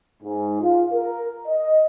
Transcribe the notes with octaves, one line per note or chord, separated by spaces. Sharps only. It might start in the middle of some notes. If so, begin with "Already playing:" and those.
G#2
F4
A#4
D#5